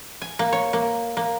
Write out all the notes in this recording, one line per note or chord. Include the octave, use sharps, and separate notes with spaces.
G#5
A#3
C#5
A#3
A#3